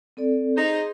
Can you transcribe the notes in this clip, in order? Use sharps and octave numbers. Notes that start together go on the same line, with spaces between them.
C4 A4 D5
D#4 G#4 C5